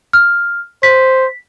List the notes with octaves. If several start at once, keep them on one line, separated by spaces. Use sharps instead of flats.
F6
C5 B6